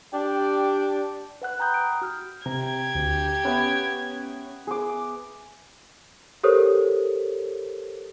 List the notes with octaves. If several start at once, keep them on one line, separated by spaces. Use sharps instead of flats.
D4 G4 D5 G5
B4 F#5 F#6
G5 A#5 B5 D#6 G6
D7
F#4 F6
C3 G4 A#5 G#6
D2
B3 C#4 B4 E5
G#4 D6
G4 A4 A#4 C5 C#5 D#6